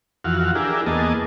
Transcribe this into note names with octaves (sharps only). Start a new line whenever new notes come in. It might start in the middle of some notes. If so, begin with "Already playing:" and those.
F2 E3 F#4 F5
D4 E4 G4 G#4 A#4
E2 A#3 B3 G#4 D#5 A5